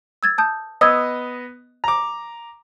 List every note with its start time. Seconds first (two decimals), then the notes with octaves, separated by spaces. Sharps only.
0.23 E6 G#6 A6
0.38 A5 D#6 G6
0.81 B3 D#5 D#6 E6 G#6
1.84 A#5 D6